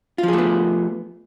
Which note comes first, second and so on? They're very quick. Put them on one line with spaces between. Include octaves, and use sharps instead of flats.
F4 F3 G#4 A3 B3